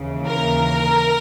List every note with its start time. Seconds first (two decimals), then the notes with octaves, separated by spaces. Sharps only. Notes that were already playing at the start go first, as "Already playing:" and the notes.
Already playing: D#2 C#3 E3
0.27 A#4